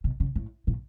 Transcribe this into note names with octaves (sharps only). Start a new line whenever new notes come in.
B2
C#3
A2
A#2